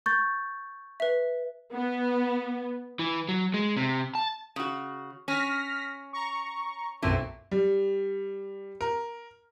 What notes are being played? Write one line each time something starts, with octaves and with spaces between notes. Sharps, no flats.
C#6 G6 A6
B4 E5
B3
E3
F#3
G#3
C3
A5
C#3 F#4
C#4 F6 A#6 B6
A#5 C#6
B1 F#2 A#2 A3 C4
G3
A#4